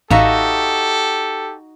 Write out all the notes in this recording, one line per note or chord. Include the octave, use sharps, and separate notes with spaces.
A1 D#4 F#4 G4 A4 E5 F5